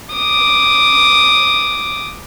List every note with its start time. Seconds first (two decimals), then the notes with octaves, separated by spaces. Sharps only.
0.15 D6 D#6